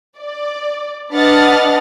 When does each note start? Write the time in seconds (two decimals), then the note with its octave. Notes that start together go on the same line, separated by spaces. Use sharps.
0.17 D5
1.12 D4 B4 D#5 F#5 F6 A6